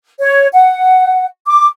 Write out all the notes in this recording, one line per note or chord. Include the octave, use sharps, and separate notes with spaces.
C#5
F#5
D6